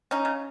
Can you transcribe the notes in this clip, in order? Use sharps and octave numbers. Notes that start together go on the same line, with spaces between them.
C#4 D#4
C#3